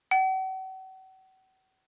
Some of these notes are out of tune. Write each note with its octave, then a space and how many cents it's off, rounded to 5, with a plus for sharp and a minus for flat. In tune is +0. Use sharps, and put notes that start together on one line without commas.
F#5 +40